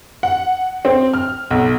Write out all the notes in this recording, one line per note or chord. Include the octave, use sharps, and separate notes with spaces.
F#5
C4
F6
B1